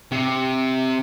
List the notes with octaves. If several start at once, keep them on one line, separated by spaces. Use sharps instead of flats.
C3